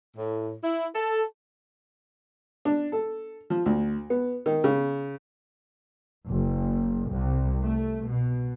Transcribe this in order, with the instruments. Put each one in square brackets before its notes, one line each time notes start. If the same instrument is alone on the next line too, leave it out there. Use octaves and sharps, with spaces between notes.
[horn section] A2
E4
A4
[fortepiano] D4
A4
F3
D2
B3
D#3
C#3
[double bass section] F#1
C2
A3
B2